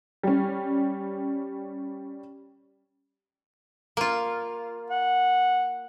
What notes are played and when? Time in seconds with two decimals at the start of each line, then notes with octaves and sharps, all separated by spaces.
0.23 G3 C#4
3.97 A#3 F4
4.90 F#5